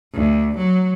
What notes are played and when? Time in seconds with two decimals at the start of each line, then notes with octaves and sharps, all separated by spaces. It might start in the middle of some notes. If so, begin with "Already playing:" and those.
0.14 D2
0.58 F#3